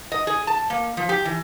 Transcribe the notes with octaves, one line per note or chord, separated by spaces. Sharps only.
D#5
G#4
A5
A#3
F3
G4
E3